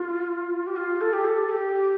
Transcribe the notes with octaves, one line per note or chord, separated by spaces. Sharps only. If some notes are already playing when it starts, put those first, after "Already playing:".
Already playing: F4
G4
F4
A4
G4
A4
G4